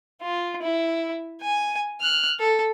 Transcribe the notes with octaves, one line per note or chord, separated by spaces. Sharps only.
F4
E4
G#5
F6 F#6
A4